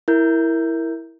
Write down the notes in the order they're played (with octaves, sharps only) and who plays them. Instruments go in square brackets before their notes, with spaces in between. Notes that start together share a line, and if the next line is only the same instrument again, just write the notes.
[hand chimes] E4 A#4 G6